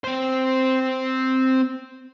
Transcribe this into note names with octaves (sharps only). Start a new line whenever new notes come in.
C4 C5